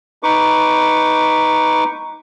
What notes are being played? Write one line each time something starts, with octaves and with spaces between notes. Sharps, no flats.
D#4 B4 C#6 D6